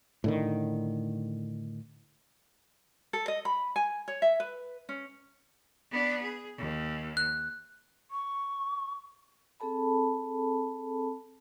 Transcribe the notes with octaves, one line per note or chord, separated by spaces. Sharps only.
A2 D3 D#3
A4
D#5
B5
G#5
C#5
E5
B4
C#4
B3 D4
G#4
D#2
F#6
C#6
C4 G#4 A4 A5 B5